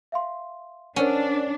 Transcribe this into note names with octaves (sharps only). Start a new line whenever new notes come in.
E5 F5 C6
C#4 D4 A#4 C5 F#5